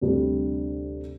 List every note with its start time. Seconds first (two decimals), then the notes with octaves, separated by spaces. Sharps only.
0.01 D2 C3 G3 D4 G4